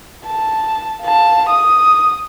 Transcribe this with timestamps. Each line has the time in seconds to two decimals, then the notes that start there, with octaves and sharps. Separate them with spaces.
0.26 A5
1.02 F5 A5
1.49 D#6